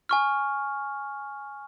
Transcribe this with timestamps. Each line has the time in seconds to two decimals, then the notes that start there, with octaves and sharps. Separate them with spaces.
0.09 G#5 C#6 F6